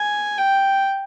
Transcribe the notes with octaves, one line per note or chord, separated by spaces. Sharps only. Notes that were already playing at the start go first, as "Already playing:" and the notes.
Already playing: G#5
G5